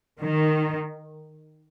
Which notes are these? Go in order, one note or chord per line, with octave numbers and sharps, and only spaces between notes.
D#3